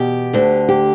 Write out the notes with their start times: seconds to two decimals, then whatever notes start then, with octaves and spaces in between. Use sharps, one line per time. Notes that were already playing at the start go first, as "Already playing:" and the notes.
Already playing: E2 B2 G4
0.33 D2 D3
0.69 G4